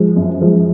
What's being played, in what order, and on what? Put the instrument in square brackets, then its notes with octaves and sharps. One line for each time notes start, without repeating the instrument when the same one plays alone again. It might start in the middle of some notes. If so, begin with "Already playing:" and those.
Already playing: [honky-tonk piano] F3 G#3
F#2
F3 G#3